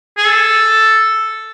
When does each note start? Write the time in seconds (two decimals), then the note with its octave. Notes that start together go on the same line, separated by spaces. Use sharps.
0.18 G#4
0.26 A4